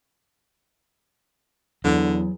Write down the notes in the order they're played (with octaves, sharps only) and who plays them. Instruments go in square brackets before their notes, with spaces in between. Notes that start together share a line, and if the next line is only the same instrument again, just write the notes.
[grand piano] E2 [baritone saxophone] D3 [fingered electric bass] F#3